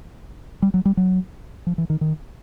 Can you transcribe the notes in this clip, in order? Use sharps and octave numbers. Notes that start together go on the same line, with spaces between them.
G3
F#3
G3
F#3
F3
E3
D#3
D#3